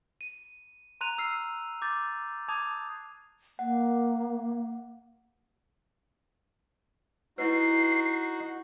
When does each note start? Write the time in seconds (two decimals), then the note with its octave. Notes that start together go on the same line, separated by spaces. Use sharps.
0.21 D#7
1.01 A#5 C6 F#6 D#7 F7
1.18 E6 F6 C7
1.82 D6 G6 A6
2.48 A5 D6 D#6 G#6 F7
3.59 A#3 F#5
7.38 D#4 E4 F#4 B4 C7